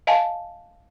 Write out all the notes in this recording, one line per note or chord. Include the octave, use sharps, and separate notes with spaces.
D#5 F5 G#5 A5